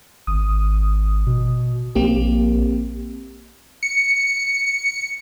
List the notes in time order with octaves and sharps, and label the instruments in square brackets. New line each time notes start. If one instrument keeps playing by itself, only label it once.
[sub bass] G#1 [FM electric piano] D#6
[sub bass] B2
[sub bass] A#1 [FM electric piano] A#3 C4 G4
[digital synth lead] C#7